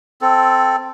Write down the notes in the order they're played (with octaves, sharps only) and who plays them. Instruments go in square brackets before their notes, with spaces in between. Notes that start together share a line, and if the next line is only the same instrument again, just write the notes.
[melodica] C4 A4